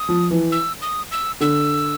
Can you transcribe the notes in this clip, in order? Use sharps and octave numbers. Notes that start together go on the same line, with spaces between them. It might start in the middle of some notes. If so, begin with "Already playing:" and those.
Already playing: D#6
F3
E3
E6
D#6
E6
D3 E6